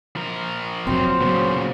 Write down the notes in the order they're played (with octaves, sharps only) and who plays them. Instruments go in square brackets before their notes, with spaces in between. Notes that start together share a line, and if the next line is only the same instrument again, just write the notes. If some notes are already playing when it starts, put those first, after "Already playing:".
[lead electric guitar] F3 A#4
[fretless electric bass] F1 F#3 [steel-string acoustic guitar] C4 [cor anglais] C5
[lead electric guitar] A#2 C#3 [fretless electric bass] F#3 B3